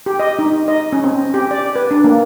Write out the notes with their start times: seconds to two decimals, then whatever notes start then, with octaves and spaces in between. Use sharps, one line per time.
0.06 G4
0.20 D#5
0.39 D#4
0.68 D#5
0.93 C#4
1.04 C4
1.34 G4
1.51 D5
1.76 B4
1.91 D4
2.04 A#3